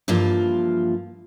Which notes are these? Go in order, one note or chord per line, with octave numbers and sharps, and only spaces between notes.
G2 E3 F3 A#3 F4